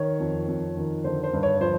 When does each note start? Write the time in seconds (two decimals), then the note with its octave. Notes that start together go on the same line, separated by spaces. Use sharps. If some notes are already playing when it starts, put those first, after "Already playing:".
Already playing: D#3 C#5
0.20 F2
0.48 F2
0.77 D#3
1.04 D3 C5
1.24 C5
1.33 G2
1.43 C#5
1.61 F3 C5